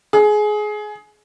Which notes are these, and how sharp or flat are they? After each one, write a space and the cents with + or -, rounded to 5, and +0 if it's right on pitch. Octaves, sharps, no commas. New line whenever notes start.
G#4 +20